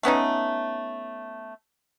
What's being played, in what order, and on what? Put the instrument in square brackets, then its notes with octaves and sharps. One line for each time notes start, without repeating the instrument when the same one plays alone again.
[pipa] A3 B3 C#4 D#4